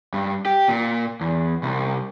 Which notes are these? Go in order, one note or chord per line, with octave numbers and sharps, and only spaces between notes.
G2
G4
A#2
E2
C2